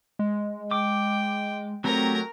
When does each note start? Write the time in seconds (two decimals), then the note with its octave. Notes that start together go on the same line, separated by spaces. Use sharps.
0.19 G#3
0.71 G5 D6
1.84 F#3 A3 C4 G4 A#4 A#5